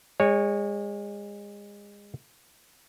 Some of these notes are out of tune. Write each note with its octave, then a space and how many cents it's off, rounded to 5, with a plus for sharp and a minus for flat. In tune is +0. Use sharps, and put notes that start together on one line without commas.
G#3 -30 C#5 +0